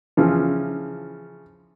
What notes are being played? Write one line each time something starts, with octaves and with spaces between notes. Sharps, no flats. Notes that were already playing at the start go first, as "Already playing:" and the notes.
C#3 E3 F3